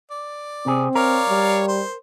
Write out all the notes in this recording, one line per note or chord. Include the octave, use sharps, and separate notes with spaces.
D5
C3 C4 G#4
A#4 C#5 D5 F5
G3
C5